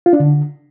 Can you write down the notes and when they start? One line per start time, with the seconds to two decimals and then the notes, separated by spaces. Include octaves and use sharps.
0.06 F4
0.13 D4
0.20 D3